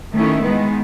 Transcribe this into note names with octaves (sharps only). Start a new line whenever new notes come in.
D#3 A3 C#4 E4
D#3 G#3 B3